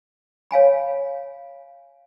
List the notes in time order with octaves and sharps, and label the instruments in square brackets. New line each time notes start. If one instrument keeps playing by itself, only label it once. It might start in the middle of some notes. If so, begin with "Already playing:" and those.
[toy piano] C#5 F5 G#5 B5